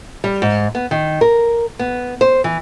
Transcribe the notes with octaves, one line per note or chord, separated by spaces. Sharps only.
G3
G#2
B3
D#3
A#4
B3
C5
E3